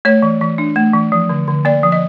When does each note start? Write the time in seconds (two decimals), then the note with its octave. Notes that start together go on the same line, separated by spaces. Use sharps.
0.05 A3 C#5
0.22 E3
0.41 E3
0.58 D4
0.76 A3
0.93 E3
1.12 F3
1.29 D3
1.48 D3
1.65 A#3 D5
1.83 F3
1.92 D#5